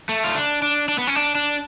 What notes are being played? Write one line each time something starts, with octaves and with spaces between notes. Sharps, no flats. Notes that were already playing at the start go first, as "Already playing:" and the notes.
A3
F4
D4
D4
D4
B3
C#4
D4
D4